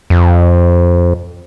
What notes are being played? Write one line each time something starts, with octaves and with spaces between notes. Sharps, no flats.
F2